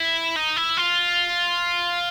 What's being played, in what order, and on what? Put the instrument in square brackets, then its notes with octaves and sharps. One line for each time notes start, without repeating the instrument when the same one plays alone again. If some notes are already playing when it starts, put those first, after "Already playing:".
Already playing: [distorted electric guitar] E4
D#4
E4
F4